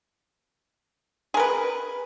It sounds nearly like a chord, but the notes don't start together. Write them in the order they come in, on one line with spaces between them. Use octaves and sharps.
G#4 A#4 B4